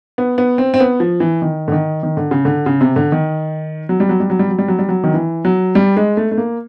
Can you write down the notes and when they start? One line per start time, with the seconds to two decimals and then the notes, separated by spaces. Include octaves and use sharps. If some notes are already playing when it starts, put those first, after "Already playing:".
0.18 B3
0.38 B3
0.58 C4
0.74 C4
0.80 B3
1.00 F3
1.20 E3
1.42 D#3
1.68 D3
1.72 D#3
2.03 D#3
2.17 D3
2.31 C#3
2.45 D3
2.66 C#3
2.81 C3
2.96 D3
3.12 D#3
3.89 F#3
4.00 G3
4.09 F#3
4.20 G3
4.30 F#3
4.39 G3
4.48 F#3
4.58 G3
4.68 F#3
4.78 G3
4.89 F#3
5.04 D#3
5.14 E3
5.45 F#3
5.75 G3
5.97 G#3
6.17 A3
6.31 A3
6.38 A#3